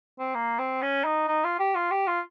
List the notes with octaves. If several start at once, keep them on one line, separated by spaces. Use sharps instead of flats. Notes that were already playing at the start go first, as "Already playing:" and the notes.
C4
A#3
C4
C#4
D#4
D#4
F4
G4
F4
G4
F4